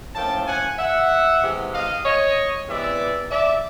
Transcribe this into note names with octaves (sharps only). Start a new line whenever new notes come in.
A2 F3 A#3 C#4 G5 A5
F#5 G#5
E5 F#5
C3 E3 G#3
D#5 F5
C#5 D#5
C3 E3 G#3 B3 D5 E5
D5 E5